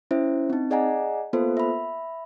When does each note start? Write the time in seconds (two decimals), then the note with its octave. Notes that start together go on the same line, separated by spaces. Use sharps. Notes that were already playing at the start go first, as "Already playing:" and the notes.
0.11 C#4 E4 C5 E5
0.50 C4 D#4
0.71 G#4 D5 D#5 F#5 G#5 A#5
1.33 A#3 B3 F4 A4 C5
1.57 E5 B5